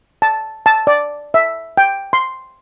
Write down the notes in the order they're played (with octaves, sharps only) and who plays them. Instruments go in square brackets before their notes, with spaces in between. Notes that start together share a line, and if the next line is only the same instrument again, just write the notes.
[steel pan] A5
A5
D5
E5
G5
C6